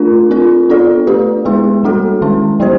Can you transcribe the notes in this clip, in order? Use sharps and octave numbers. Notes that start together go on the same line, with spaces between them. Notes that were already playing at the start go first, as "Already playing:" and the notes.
Already playing: A3 D4 F4 A#4
C4 F4 A#4 D5
B3 D4 F4 A4 D5
A3 D4 G4 B4
G#3 B3 E4 G#4
G3 A#3 D4 F#4 A4
D#3 G#3 C#4 E4
F#3 B3 E4 G4 C5